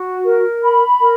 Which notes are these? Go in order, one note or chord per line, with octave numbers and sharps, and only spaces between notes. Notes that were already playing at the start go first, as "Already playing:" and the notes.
Already playing: F#4
A#4
B5
A#4